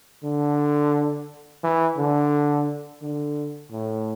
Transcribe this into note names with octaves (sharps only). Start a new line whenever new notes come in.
D3
E3
D3
D3
A2